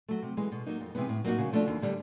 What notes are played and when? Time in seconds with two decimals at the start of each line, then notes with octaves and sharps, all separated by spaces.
0.09 F#3 A3
0.22 C3
0.37 E3 G#3
0.52 B2
0.66 F#3 A#3 D#4
0.81 F2
0.95 C3 E3 G#3 B3
1.09 A2
1.24 F#3 A#3 D#4 F#4
1.38 C#3
1.53 F3 A3 D4
1.68 D#2
1.82 D3 G3